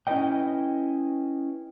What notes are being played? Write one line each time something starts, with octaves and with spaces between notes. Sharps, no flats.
C#4 E4 A4 B4 D#5 G5